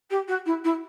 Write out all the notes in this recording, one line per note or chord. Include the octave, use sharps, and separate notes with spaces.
G4
F#4
E4
E4